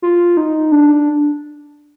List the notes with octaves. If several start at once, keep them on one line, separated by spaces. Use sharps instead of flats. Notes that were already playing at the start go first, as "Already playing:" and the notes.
F4
D#4
D4